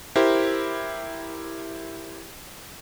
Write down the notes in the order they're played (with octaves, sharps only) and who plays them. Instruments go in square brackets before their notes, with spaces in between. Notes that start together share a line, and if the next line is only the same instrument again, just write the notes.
[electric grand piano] E4 G4 A#4 C5